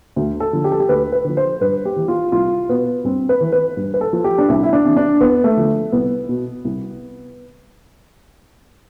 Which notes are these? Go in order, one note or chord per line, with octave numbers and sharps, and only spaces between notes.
D2
A4
D3 F3
G4
A4
G4
D2 B4
B4
D3 F3
C5
G2 B4
G4
E3
F4
C2 F4
B2 B3
G2 C4
B4
E3
B4
G2
B4
A4
F3
G4
D4
C2 E4
E4
D4
C3 E3
D4
E2 B3
A3
D3 F3
C2 B3
B2
C2